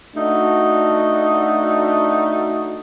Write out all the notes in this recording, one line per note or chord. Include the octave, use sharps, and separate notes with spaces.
A3 D4 D#4 F#4